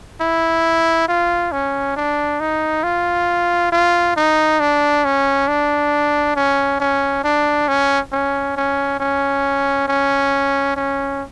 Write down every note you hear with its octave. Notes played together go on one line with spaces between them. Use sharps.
E4
F4
C#4
D4
D#4
F4
F4
D#4
D4
C#4
D4
C#4
C#4
D4
C#4
C#4
C#4
C#4
C#4
C#4